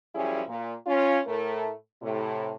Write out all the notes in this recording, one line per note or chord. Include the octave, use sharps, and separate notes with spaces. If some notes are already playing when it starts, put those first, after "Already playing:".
F#2 F3 G3 C#4 E4 G#4
A#2
C#4 F4
A2 A3 A#4
A2 C3